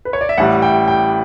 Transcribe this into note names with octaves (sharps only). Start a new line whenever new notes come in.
B4
C#5
D5
E5
A1 A2 G3 F#5
G5
G5